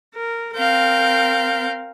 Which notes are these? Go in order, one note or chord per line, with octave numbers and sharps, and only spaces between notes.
A#4
C4 A#4 F5 G6